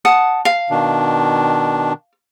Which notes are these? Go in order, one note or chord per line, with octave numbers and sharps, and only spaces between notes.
F#5 A5 D#6
F5
B2 D#3 D4